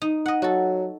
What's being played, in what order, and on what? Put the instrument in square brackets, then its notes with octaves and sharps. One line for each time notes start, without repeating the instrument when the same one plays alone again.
[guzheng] D#4
D#5 F#5
[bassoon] F#3 [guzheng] F#4 A4